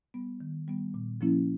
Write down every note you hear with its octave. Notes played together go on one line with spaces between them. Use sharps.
G3 B3
D#3
G3 B3
A#2
F3 A#3 C#4 E4